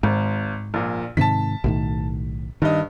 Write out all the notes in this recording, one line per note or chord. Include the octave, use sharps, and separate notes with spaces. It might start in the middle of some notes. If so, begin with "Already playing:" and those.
G#1 G#2
A#1 A#2
G#2 C3 D#3 A5 B6
B1 A2 D#3
G2 D#3 D#5